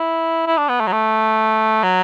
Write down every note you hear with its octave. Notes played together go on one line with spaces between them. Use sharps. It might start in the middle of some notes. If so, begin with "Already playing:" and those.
Already playing: E4
E4
D4
B3
A3
F#3
A3
F#3